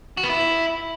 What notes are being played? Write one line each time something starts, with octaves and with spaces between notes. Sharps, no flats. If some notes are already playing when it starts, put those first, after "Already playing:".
F#4
B3
E4